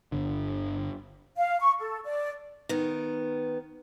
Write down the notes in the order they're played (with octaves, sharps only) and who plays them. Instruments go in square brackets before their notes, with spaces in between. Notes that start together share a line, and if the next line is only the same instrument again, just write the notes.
[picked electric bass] G1 D3
[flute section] F5
C#6
A4
D5
[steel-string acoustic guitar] D#3 B3